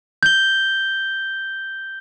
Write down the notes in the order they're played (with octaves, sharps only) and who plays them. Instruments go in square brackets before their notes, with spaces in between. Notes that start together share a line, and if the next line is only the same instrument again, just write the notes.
[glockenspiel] G6 G7